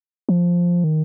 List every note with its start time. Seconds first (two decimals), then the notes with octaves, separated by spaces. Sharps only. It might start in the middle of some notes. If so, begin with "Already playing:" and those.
0.29 F3
0.84 D#3